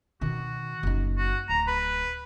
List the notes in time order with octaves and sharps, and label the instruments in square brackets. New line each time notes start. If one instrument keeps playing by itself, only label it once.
[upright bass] B2 D#3 [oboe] F#4
[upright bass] F#1 D#4
[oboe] F#4
[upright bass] D1 [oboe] A#5
[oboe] B4